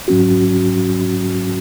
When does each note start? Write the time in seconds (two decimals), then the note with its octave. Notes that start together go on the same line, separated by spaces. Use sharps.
0.08 G#2 F#3 C#4 F#4